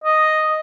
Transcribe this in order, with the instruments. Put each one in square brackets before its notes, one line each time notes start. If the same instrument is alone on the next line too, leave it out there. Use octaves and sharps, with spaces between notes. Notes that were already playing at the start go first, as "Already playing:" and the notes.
[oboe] D#5